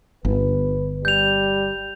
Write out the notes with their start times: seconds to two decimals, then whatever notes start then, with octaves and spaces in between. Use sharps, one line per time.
0.25 G1 B4
1.05 G3 G6 F7